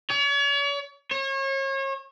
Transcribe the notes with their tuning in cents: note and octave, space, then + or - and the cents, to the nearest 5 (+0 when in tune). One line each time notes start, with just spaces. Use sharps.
C#5 +40
C#5 -35